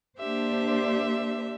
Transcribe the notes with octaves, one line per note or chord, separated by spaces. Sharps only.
A#3 D4 G4 C5 E5